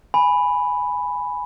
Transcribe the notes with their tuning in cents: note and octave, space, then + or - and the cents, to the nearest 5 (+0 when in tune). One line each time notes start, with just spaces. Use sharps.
G#5 +0 B5 +0